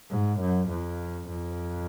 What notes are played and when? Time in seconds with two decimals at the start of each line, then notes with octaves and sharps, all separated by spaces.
0.11 G#2
0.41 F#2
0.70 F2
1.29 F2